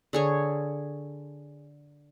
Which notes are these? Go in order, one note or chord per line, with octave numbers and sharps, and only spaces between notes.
D3 G#4 C#5